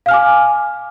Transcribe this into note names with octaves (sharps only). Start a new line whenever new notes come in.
F5 G#5 D6 F6